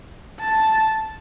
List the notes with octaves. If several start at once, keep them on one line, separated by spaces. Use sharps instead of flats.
A5